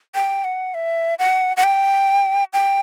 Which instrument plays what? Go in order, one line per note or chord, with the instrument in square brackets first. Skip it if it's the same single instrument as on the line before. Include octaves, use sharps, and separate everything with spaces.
[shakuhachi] G5
F#5
E5
F#5
F#5
G5
G5